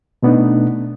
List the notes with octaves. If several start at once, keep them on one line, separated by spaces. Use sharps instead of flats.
B2 A3 B3 D4 D#4